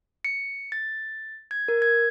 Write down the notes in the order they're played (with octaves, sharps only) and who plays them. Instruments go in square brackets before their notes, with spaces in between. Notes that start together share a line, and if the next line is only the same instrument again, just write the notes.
[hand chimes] C#7
A6
G#6
A#4
G#6